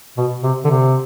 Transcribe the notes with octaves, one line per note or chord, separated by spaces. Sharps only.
B2
C3
D3
C3